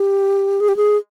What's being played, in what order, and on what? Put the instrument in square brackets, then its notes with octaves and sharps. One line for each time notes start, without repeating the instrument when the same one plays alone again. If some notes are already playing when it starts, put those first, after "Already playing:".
Already playing: [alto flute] G4
G#4
G4
G#4